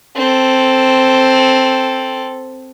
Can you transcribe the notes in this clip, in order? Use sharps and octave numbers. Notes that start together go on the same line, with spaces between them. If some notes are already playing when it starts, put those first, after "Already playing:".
C4 A4